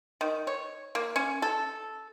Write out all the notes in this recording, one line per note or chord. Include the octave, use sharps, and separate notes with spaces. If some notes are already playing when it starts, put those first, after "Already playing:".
D#3
C#5
A#3
C#4
A4